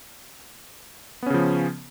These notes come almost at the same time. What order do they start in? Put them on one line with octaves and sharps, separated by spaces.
B3 C#4 C#3 F3